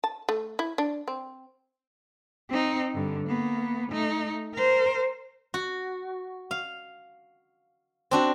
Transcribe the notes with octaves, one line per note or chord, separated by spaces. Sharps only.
A5
A3
E4
D4
C4
C4 D#4
G2 D3
A#3 B3
A3 D#4
A#4 C5
F#4
F5
C4 D4 F#4